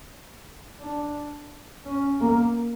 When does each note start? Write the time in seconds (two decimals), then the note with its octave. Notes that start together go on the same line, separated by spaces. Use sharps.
0.80 D4
1.86 C#4
2.21 A#3